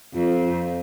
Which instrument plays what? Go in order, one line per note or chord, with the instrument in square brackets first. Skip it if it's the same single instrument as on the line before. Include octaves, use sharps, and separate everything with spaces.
[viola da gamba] F2